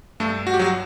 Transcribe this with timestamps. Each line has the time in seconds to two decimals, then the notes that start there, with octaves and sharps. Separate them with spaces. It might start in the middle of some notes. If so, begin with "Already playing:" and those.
0.20 G2 A3 A4
0.47 F#4
0.54 G4
0.59 F#3 F#4